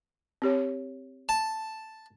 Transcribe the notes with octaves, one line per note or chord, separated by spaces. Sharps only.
C4 G4 C#5
A5